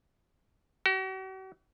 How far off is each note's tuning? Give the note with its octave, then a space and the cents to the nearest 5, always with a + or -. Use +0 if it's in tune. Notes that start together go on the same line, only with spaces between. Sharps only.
F#4 +45